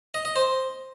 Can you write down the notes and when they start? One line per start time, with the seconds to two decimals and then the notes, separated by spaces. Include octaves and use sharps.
0.14 D#5
0.25 D#5
0.36 C5